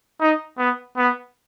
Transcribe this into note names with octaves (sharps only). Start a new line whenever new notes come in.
D#4
B3
B3